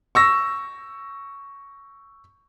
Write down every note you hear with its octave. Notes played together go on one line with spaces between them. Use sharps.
C#6 E6 A#6